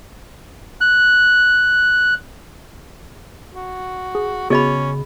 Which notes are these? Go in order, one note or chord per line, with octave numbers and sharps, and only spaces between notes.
F#6
F#4
G#4
C#3 B3 C#4 F#4 G#4 D#5 B5